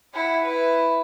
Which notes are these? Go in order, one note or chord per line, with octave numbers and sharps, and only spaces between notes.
E4 F#5
E4 B4